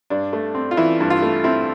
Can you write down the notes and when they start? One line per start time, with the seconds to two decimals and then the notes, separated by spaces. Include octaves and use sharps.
0.10 G2 D4
0.33 A3
0.55 C4
0.71 F4
0.77 E3 E4
1.00 G2
1.10 F4
1.22 A3
1.44 C4 E4